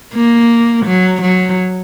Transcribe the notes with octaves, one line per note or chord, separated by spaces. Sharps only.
A#3
F#3
F#3